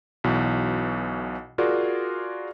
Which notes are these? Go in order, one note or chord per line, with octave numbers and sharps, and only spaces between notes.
B1 B2 E3
F4 F#4 G#4 A#4 D5